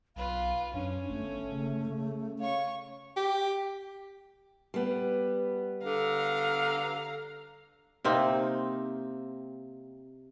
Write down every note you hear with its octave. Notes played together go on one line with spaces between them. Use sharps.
B1 F4 B4 F5
F#2 C#4 D4
G1 A3
C#3
C#3
C#5 F5 C#6
G4
G3 B3
D3 F5 A#5
C3 A#3 C4 D#4